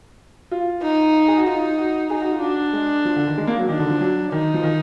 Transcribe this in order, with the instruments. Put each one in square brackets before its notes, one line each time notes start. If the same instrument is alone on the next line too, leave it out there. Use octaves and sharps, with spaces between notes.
[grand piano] F4
[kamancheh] D#4
[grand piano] G#4
F#4
[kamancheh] D#4 [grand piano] F4
[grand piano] F#4
[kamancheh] D#4 [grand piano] G#4
[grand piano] F#4
F4
[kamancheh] D4 [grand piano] F#4
[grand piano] G#3
F3
D3
D#3
G#3
A#3
F#3
[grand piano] D#3 [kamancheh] D4
[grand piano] D3
F3
F#3
[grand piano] D#3 [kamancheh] D#4
[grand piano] F3
D#3